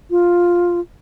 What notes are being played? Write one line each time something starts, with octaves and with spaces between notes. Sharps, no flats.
F4